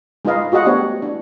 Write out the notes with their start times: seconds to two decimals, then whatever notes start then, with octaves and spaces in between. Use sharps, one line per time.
0.25 G#3 D#4 F4 B4 D#5 F5
0.52 F4 F#4 G#4 D#5 F#5
0.65 A3 B3 D4 G4 C5 C#5
1.02 D4 E4